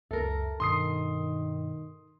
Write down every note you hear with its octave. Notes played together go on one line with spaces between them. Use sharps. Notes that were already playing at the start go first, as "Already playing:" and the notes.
C#2 F#2 A4 A#4 E5
G2 B2 D#3 C6 D#6 C7